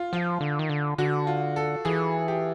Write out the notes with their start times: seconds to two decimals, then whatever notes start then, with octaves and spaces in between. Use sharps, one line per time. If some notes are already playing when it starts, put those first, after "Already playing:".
Already playing: F4
0.13 F3 F4
0.41 D3
0.59 D#3
0.69 D3
0.98 D3 F#4
1.27 F4
1.56 A4
1.85 E3 G#4
2.28 G4